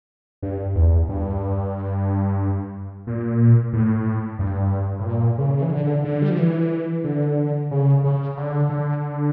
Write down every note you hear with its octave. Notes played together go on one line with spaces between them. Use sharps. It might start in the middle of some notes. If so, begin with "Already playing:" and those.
G2
E2
G2
A#2
A2
G2
A2
A#2
C#3
E3
D3
D3
G3
F3
E3
D3
C#3
C#3
D3
D3